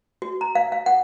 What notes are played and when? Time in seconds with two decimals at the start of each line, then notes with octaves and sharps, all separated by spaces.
0.22 F#4
0.41 A#5
0.55 F5
0.72 F5
0.86 F#5